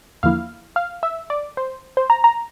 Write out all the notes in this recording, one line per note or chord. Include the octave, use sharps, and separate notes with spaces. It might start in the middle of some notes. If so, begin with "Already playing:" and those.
E2 D3 F3 A#3 E4 F5
F5
E5
D5
C5
C5
A#5
A#5